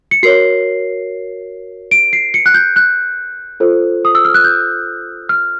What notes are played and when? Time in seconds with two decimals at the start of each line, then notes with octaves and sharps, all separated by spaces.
0.11 C#7
0.23 F#4 A#4 C#5 C7
1.91 D7
2.13 C7
2.34 C#7
2.46 F#6
2.54 G6
2.76 F#6
3.60 F4 A4 C5
4.05 D#6
4.15 E6
4.25 F6
4.34 F#6
4.44 G6
5.29 F6